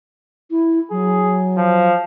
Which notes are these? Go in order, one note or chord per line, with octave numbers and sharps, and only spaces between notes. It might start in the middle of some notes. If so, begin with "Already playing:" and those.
E4
F#3 G#4
F3